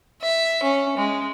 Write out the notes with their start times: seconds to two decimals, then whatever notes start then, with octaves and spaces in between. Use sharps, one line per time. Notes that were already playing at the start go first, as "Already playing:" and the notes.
0.22 E5
0.63 C#4
0.98 G#3